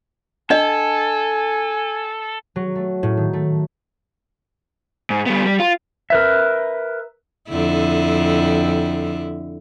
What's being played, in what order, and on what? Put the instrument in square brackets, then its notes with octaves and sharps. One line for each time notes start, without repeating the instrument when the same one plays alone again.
[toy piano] D4 D#5 [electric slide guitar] A4 [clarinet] G#5
[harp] F#3
A3
A2
D#3
A3
[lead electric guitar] G#2
G3 B3
G3
F4
[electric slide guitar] A#4 B4 E5
[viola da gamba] F2 D3 E4